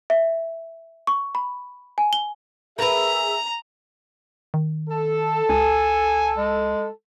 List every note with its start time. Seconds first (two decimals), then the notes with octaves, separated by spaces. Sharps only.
0.10 E5
1.07 C#6
1.35 B5
1.98 G#5
2.13 G7
2.78 G#4 A#4 B4 E5 A#5
4.54 D#3
4.90 A4
5.49 C#2 G#5
6.37 G#3